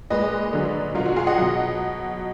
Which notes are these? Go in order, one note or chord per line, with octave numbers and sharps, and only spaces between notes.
A#2 G#3 B4 D#5
D3 F#3
B2 F#3 F4
F#4
F4 G#4
D#5 F#5
B2 F#3